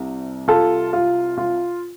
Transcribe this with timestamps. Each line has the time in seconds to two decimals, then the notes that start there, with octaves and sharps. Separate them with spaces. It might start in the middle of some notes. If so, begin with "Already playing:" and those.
Already playing: C2 C3
0.48 F4 A4
0.93 F4
1.38 F4